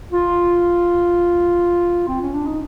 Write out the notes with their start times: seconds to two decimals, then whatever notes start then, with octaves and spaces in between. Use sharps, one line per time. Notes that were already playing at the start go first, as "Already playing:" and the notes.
0.12 F4
2.08 C4
2.21 C#4
2.34 D4
2.46 D#4